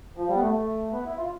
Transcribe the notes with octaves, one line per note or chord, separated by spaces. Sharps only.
F3
G3
B3
A3
A3
B3
E4
F4